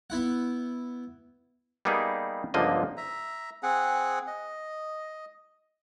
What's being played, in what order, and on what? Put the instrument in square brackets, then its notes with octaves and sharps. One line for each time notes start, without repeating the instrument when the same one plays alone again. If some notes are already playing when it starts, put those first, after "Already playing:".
[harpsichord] B3 E4 F#5
[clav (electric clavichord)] G3 A#3 B3 D#4 G4 G#4
G1 C#2 D3 F3 A#3 D#5
[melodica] E5 A#5
C4 G#4 F#5
D#5